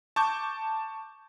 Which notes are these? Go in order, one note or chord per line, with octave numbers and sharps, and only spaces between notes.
A5 C#6 D6 G6